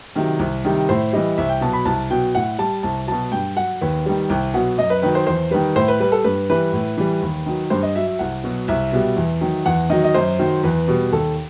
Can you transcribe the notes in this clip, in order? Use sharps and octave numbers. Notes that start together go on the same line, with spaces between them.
C3 D#3 F#3
C2
C3 D#3 G3
A2 C5
E3 G3 D#5
C2 E5
G5
B2 F#3 A5
B5
C2 A5
B2 F#3 G5
A2 F#5
G3 A5
C2 A5
B2 F#3 A5
G2 G5
F#3 F#5
D#2 B4
D#3 G3
C2 G5
B2 F#3 F#5
F#2 D#5
B4
D#3 F#3 B4
C5
E2 C5
D#3 G3 B4
A2 C5
B4
G3 B4
A4
G2 B4
E3 G3 B4
A2
E3 G3
D#2
D#3 F#3
G2 C5
D#5
F#3 E5
E5
C2 F#5
B2 F#3
C2 E5
B2 G3
E2
D#3 F#3
E2 F#5
D#3 F#3 D#5
D#5
F#2 C5
D#3 F#3
E2 B4
B2 G3
D#2 A4